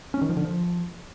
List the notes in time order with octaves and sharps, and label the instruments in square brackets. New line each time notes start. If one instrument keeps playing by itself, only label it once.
[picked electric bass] C#4
D#3
F3
D3
F3